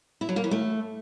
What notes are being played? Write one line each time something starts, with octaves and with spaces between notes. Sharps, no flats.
E4
F#3
A#3
E3
A3